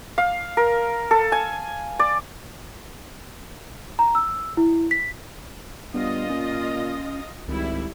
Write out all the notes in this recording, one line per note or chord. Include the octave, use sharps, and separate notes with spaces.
F5
A#4
A4
G#5
D5
A#5
E6
E4
B6
G2 B3 F4 D#5
A#2 C#4
G#1 C#2 G3 E4